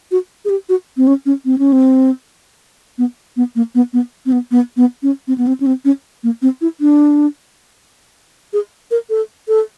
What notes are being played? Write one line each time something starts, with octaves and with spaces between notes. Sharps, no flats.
F#4
G#4
G4
F#4
C4
C#4
C#4
C4
C#4
C4
B3
B3
A#3
B3
B3
C4
B3
B3
B3
C#4
C4
B3
C4
C#4
C4
C#4
A#3
C4
E4
D4
G#4
A#4
A4
A4